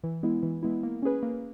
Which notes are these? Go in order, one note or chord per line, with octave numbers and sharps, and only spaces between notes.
E3
G#3 B3 E4
E3
G#3 B3 E4
A#3
C#4 G#4 B4
A#3